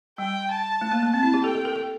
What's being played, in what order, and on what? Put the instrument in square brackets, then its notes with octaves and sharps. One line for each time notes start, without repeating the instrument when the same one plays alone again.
[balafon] G3 [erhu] G5
[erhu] A5
[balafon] A3
A#3
A#3
[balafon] C4 [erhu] A5
[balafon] E4
G4
[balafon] A4 [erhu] G5
[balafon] A4
A#4
A4